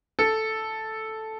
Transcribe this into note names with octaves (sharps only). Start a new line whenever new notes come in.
A4